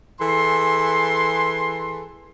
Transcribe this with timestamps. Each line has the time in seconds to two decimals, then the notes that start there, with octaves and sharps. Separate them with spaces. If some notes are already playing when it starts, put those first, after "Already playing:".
0.20 E3 G#4 A4 C6